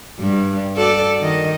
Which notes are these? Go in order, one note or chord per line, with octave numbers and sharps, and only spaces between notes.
G2
F#4 A4 D5
D#3 D#5